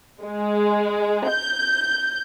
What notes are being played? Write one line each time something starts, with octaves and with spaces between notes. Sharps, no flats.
G#3
G6